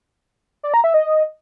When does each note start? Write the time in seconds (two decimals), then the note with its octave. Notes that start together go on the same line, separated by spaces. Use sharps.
0.63 D5
0.74 A#5
0.84 E5
0.94 D#5